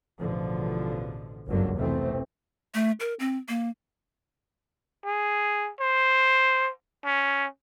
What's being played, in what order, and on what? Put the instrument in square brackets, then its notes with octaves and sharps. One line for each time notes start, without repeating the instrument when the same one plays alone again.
[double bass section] A1 E2 B2 D3 F3
G1 C#2 F#2 D3 F#3 A#3
F1 B2 E3 A3 C4
[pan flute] A3
A#4
C4
A#3
[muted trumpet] G#4
C5
C#4